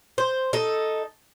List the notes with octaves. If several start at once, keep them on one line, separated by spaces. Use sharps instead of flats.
C5
D#4 A4